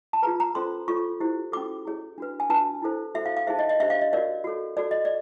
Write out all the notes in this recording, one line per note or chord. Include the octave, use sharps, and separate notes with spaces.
A5
F4 G#4 B4 A#5
A#5
C#4 F4 A4 C5 C6
F4 A4 C#5 C#6
E4 G4 C5
C#4 F#4 A4 D6
E4 G#4 C#5
D4 F#4 B4
G#5
D4 F#4 B4 A5
E4 A4 C5
F#4 A4 C5 E5
F5
F5
D#4 G#4 C5 E5
D#5
D#5
D4 G4 C5 E5
F5
D#5
F#4 A#4 C#5 D5
F#4 A4 C#5
F#4 A4 C#5 D5
D#5
D5